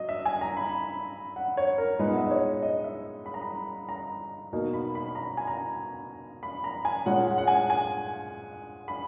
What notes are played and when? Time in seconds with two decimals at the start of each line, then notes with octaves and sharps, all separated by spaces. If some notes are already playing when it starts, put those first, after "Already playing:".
Already playing: F#3 D#5
0.09 E5
0.25 G#5
0.41 A#5
0.57 B5
1.36 F#5
1.57 C#5
1.78 A#4
1.99 A#2 G#3 B3 D#4 B4
2.09 F#5
2.16 E5
2.24 D#5
2.31 C#5
2.62 D#5
2.84 E5
3.26 B5
3.34 A#5
3.42 B5
3.89 A#5
4.53 B2 A#3 D#4
4.74 B5
4.95 B5
5.09 B5
5.15 A#5
5.37 G#5
5.47 A#5
6.43 B5
6.64 A#5
6.85 G#5
7.06 A#2 G#3 C#4 F#5
7.27 F#5
7.38 F#5
7.47 G#5
7.70 G#5
8.88 B5